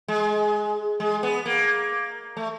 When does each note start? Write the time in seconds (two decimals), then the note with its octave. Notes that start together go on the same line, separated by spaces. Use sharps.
0.08 G#3
1.00 G#3
1.23 B3
1.46 A#3
2.37 A3